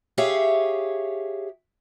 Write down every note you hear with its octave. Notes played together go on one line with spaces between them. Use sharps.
G4 G#4 C#5 E5 F5